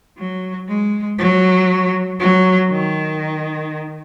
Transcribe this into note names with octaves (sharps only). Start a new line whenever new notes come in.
F#3
G#3
F#3
F#3
D#3